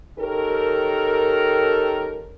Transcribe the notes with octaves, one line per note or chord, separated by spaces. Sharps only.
D#3 C#4 G4 A4 A#4